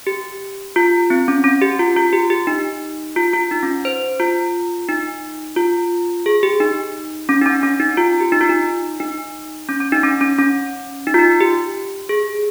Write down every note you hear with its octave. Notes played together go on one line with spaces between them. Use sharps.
G4
F4
C4
C#4
C#4
G4
F4
F4
G4
G4
D#4
F4
F4
D#4
C#4
C5
F4
D#4
F4
G#4
G4
D#4
C#4
D#4
C#4
C#4
D#4
F4
G4
D#4
F4
D#4
D#4
C#4
C#4
D#4
C#4
C#4
C#4
D#4
F4
D#4
G4
G#4